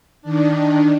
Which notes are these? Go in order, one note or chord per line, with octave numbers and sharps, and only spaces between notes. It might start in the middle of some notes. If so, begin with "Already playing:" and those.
D#3 D4